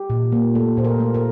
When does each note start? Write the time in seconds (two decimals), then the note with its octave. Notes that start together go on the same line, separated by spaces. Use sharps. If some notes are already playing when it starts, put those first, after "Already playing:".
Already playing: G4
0.10 A#2
0.32 A#3
0.55 A3 A4
0.77 A#2 C5
0.85 A#4
1.00 A3
1.14 A#4